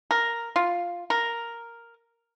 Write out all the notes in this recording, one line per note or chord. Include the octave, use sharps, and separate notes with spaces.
A#4
F4
A#4